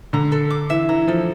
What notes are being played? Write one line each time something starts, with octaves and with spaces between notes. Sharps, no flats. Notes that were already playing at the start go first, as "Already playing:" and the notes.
D3 A#5
A4
D6
E3 E5
E3 A#5
F3 A4